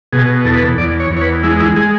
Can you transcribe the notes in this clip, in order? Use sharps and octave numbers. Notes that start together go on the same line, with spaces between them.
B2 G#4
E2 A4
B4
A4
E2 D5
C#5
E2
C#5
B4
G#3 E4
E4
G#3 G#4